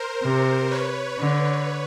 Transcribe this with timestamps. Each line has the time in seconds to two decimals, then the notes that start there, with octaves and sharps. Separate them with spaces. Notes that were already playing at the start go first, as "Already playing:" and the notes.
Already playing: A#4 C5
0.24 C3
0.71 B4 C#5
1.18 D3 B4 C#5